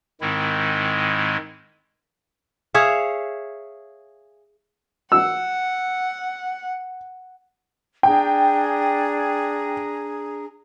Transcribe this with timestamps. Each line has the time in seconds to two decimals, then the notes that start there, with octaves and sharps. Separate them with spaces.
0.21 G#2 D#3 G#3 C4 E4
2.74 G#4 C#5 E5 F5
5.12 F#5 E6
8.03 D4 G#4 G5 A#5